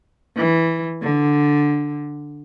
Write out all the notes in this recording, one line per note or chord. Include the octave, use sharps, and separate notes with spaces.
E3
D3